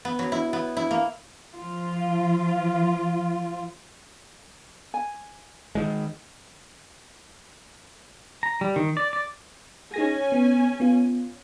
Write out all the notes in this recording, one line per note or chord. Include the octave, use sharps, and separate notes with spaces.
B3
F#3
E4
B3
E4
A#3
F3 F4
G#5
D#3 G#3
A#5
G3
D#3
D5
D5
C#4 D#4 G#4 G#5 A#6
B3
B3 F4